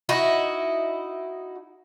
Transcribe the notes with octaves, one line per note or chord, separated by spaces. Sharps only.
D#4 E4 F#4